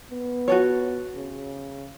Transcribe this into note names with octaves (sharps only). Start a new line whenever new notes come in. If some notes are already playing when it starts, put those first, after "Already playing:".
B3
F#4 A4 C#5
C#3